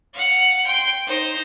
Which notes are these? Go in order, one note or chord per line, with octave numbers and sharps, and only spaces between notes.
F5 F#5
G5 C6
D#4 C5